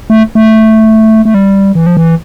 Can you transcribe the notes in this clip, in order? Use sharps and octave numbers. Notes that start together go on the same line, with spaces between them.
A3
A3
A3
G3
E3
F3
E3